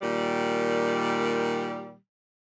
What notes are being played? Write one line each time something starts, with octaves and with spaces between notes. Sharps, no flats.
A#2 D#3 G3